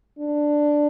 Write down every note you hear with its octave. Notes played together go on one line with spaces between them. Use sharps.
D4